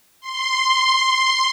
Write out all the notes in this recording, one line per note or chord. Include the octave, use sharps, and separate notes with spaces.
C6